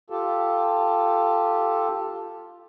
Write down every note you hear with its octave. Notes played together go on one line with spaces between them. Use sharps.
F4 G4 A4